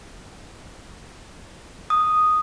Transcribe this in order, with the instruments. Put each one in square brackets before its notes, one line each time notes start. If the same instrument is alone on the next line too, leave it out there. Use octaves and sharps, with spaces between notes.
[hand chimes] D#6